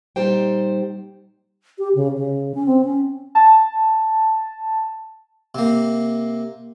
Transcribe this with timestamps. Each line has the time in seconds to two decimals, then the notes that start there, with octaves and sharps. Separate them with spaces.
0.16 A#2 G3 D#4 G4 C5 G5
1.79 G4
1.95 C#3
2.16 C#3
2.55 C#4
2.67 C4
2.85 C#4
3.35 A5
5.55 C3 A#3